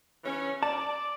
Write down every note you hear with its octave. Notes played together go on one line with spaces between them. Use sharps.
E3 C#4
D5 A5